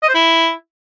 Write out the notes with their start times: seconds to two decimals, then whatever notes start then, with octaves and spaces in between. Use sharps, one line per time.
0.02 D#5
0.08 C5
0.14 E4